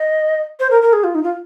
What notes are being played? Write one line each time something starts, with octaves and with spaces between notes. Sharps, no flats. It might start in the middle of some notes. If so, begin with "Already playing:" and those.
Already playing: D#5
C5
A#4
A#4
G#4
F4
D#4
F4